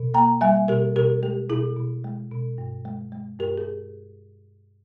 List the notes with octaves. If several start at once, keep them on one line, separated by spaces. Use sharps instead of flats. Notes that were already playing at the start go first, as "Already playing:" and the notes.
Already playing: B2
A#3 G5 A#5
G3 E5 G#5
B2 G4 A#4
B2 G4 A#4
G#3 G4
B2 E4 G#4
B2
G#3
B2
G2
G#3
G#3
G2 G4 A#4
G#4